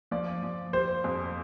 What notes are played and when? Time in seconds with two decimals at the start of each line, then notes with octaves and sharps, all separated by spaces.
0.11 F3 D5
0.43 F3
0.73 G3 C5
1.04 F2